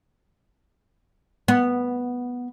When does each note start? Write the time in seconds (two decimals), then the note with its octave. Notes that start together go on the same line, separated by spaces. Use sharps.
1.48 B3